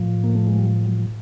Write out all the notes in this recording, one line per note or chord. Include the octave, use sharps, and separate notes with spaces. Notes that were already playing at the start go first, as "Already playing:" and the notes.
Already playing: A2 F3
A#3
A3
G#3
G3
F#3